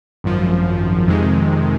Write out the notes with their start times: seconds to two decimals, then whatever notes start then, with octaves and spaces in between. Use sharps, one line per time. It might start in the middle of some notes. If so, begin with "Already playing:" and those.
0.24 G#1 F#2 F3
1.08 F2 C3 D#3 G#3